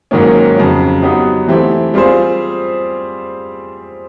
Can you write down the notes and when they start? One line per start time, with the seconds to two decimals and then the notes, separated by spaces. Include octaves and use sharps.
0.11 G#2 D#3 F#3 A#3 C#4
0.56 F2 C#3 F#3
1.02 F#3 B3 D#4 G4
1.48 E3 A3 C4 E4 G4
1.94 G3 C4 F4 G#4 C5